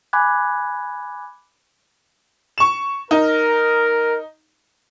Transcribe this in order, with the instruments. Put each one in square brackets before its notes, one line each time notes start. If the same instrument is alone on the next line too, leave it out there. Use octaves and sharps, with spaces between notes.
[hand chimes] G#5 B5 D6 F#6 G#6
[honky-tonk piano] C#6 E7
[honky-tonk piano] D#4 [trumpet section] A#4